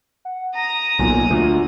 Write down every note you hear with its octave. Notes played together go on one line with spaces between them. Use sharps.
F#5
A#5 D#6 A#6
B1 A#2 G#5
D2 F4